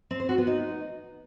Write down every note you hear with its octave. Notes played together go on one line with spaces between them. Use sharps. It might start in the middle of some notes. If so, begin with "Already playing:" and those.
C4
C5
F#4
B3
D#4